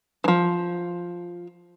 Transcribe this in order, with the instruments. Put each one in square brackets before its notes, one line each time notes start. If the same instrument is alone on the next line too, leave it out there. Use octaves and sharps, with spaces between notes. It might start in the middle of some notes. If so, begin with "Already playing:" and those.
[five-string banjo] E3 F3